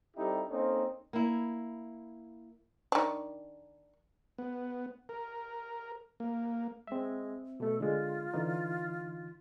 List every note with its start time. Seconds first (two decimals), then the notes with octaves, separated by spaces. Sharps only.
0.17 G3 C4 D#4 E4 G4 A4
0.49 A#3 C4 C#4 D#4 A4 C5
1.13 A#3 E4
2.92 D#3 D4
4.38 B3
5.09 A#4
6.20 A#3
6.87 G#3 C4 E5
7.60 B2 A3 A4
7.80 D3 G#3 F4
8.34 D3 E3 D#4